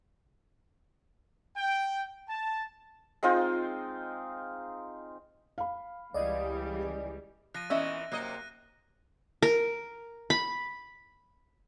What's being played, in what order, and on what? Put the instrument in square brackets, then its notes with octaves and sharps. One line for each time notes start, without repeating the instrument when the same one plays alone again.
[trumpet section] G5
A5
[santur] G#3 C4 D#4 F4
[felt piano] F5 B5
[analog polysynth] C#2 G#4 [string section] E3 G3 [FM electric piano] D5 D#5
[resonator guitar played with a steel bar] F3 [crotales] F#6 A#6 D#7
[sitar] A#2 E3 [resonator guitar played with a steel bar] B3 C#4 D#5 [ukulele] E5
[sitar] F#2 C3 D#5 [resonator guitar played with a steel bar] A#3 [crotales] F#6
[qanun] A#4
B5